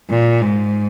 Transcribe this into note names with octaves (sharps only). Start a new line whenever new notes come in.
A#2
G#2